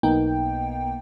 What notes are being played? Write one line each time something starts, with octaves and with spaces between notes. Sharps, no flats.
B1 A#3 B3 D#4 G5